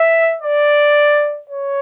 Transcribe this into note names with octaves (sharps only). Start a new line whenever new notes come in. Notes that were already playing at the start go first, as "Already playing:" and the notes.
Already playing: E5
D5
C#5